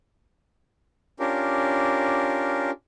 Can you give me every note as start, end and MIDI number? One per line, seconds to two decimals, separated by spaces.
1.20 2.71 61
1.20 2.71 62
1.20 2.71 65
1.20 2.71 67
1.20 2.71 70